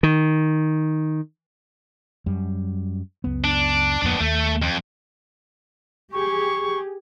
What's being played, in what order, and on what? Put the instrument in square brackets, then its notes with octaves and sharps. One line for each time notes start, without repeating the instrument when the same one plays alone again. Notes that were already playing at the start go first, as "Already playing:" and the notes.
[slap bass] D#3
[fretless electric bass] F#2 G3
C#2 F#2 B3
[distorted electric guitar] D4
[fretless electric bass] D1 F2 A#3 [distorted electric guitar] B3 D4
[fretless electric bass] D#2 [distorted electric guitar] A3
[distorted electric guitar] F2
[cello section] G4 G#4 [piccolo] C#6